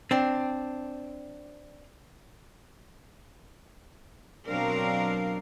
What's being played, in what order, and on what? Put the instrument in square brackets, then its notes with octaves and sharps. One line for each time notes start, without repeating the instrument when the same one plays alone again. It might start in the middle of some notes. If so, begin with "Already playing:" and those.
[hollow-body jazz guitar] C4 D4
[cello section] B2 F#3 C4 D4 A#4 F5